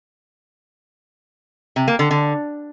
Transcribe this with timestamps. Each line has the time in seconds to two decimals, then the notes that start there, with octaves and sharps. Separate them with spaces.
1.76 C3
1.88 A#3
1.99 D3
2.11 D3